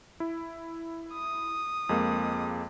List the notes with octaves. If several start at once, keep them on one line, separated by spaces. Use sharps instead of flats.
E4
D#6
F2 G#3 A#3